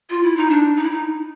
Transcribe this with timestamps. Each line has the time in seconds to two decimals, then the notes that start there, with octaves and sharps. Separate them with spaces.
0.10 F4
0.23 E4
0.37 D#4
0.50 D4
0.77 D#4
0.84 E4
0.92 D#4